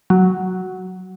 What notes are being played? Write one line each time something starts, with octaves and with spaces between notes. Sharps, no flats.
F#3